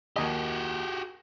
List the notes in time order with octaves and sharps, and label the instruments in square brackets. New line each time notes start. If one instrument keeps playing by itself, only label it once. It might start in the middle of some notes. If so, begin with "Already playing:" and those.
[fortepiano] D#2 D#5 [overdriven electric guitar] F#4 G4